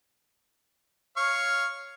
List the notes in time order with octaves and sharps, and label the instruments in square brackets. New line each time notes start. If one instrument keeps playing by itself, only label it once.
[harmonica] C#5 F5 C#6